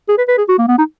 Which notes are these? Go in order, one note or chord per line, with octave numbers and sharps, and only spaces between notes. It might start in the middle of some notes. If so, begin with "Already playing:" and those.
G#4
B4
B4
G#4
F#4
A#3
B3
D#4